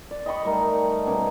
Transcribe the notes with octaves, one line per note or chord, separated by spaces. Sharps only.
D5
D#5 G5 B5 C#6
G3 A3 D#4 A#4
B2 G3 C#4 A#4